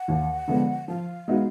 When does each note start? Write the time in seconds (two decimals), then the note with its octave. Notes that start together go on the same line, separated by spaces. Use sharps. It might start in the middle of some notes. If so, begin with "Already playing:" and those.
Already playing: F#5
0.08 D#2
0.48 D3 F3 G#3 B3
0.88 F3 F5
1.28 G#3 B3 D#4 F#4